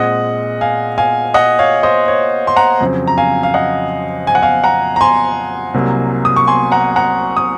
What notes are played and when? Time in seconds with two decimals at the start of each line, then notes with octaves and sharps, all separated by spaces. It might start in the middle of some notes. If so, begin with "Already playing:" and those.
Already playing: A#2 G#3 C4 D#5 F#5
0.61 F5 G#5
0.98 F5 G#5
1.34 D#5 F#5
1.59 C#5 F5
1.83 C5 D#5
2.08 C#5
2.47 C6
2.56 F#5 A#5
2.81 F2 C#3 F#3 C4
3.07 A#5
3.18 F5 G#5
3.43 F5
3.54 D#5 F#5
4.27 G#5
4.35 F#5
4.42 F5 G#5
4.64 F#5 A#5
4.96 A#5
5.01 G#5 C6
5.74 C2 C3 F#3 A#3
6.25 D#6
6.36 C#6
6.47 G#5 C6
6.72 F#5 A#5
6.96 F#5 A#5
7.37 D#6